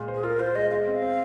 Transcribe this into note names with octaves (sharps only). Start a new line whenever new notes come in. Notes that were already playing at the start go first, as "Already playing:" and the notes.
Already playing: A#2 G#3
C5
G#4
F4 A#4
F4 C5
G#3 D#5
G#3 D#5 F5
C4
F5
C4